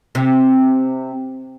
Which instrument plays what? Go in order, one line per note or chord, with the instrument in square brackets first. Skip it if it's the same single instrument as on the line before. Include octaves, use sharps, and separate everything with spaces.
[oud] C3